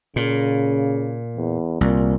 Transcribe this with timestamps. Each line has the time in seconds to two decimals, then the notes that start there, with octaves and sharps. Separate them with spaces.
0.16 A#2 C#3
1.36 E2
1.81 C2 A#2